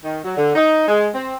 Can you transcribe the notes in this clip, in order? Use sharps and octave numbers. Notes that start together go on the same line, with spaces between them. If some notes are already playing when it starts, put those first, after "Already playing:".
D#3
F#3
D3
D#4
G#3
C4